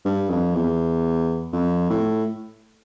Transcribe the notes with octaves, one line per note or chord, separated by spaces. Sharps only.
G2
F2
E2
F2
A2